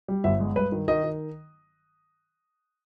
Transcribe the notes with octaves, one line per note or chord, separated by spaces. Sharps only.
G3
G1 E5
G#3
G2 B4
D#3
D#3 D#5
D#3